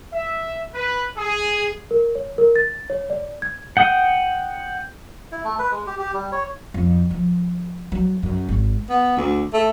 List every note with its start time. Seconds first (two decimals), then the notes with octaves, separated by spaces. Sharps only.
0.12 E5
0.74 B4
1.17 G#4
1.91 A#4
2.15 C#5
2.38 A#4
2.56 A6
2.90 C#5
3.10 D5
3.42 G#6
3.77 F#5 G5 D#6
5.32 E4
5.44 A3
5.59 B4
5.71 G#3
5.87 G4
6.00 G4
6.14 G3
6.32 C#5
6.74 F2
7.10 F3
7.92 F#3
8.23 F#2
8.48 G#1
8.89 B3
9.17 D2
9.53 A3